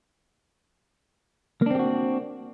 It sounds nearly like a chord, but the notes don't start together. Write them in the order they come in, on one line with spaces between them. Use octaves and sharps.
A#3 D4 C4 G4 F#4